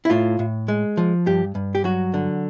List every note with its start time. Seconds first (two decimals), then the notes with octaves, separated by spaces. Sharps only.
0.05 E4
0.10 A2 F4
0.39 A2
0.68 G#3
0.97 F3
1.27 G2 G4
1.55 G2
1.75 G4
1.84 F#3 F#4
2.14 D3